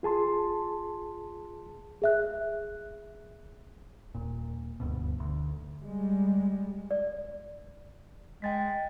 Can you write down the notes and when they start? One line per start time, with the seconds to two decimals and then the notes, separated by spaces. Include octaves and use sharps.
0.03 F4 G#4 A5 C6
2.02 G#4 E5 F#6
4.15 D#1 A#2
4.80 D#1 D2 G2 B2
5.20 D2
5.81 G3 G#3
6.91 D5
8.42 G#3 G5 A6 B6